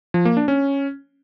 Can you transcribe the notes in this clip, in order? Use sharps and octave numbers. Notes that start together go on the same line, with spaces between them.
F3
A#3
D4
C#4